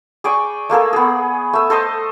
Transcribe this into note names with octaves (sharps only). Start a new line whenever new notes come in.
G#4 D5 G5 C#6
A3 A#3 G#4 A4
B3 G#4
A3 E5
A4 C5 D#5 A5